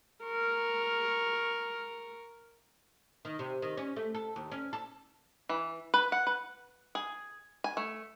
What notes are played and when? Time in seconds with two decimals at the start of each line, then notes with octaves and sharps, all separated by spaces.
0.23 A#4 C#6
3.25 D#3
3.39 C3
3.62 D#3
3.77 C#4
3.96 A3
4.15 A4
4.36 D#2
4.52 C#4
4.73 A4
5.49 E3
5.94 B4
6.12 F#5
6.27 B4
6.95 G#4
7.64 G#5
7.77 A3